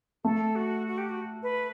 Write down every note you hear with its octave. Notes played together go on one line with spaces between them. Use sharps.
A3 A4
F#4
F#4
G4
F#4
B4